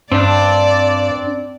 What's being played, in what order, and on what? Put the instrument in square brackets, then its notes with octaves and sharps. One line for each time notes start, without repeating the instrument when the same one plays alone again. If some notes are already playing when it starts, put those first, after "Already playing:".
[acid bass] G2 [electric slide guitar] C4 D4 [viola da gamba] D5